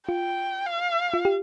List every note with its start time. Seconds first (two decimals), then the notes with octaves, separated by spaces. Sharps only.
0.09 F4 G5
0.66 F5
1.14 F4
1.25 G4